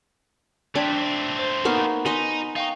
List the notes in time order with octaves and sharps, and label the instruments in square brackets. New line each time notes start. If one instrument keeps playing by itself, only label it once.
[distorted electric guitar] A3 C4 [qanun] D4 [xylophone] G5 G#6 B6
[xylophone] C5
[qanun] A#3 B3 D#4 [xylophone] C#6 F6 F7
[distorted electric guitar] D#4 [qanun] B4 D#5 [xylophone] G#5 C6
[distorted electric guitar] D#4 [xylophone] F5 G5 C#6